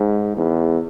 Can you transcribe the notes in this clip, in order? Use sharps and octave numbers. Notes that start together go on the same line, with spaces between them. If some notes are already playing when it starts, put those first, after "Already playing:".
Already playing: G#2
E2